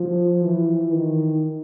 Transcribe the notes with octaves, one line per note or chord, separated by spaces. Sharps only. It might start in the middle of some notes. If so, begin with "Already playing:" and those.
Already playing: F3
E3
D#3